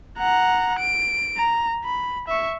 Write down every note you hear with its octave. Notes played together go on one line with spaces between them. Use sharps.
F#5 A#5
D7
A#5
B5
E5 C#6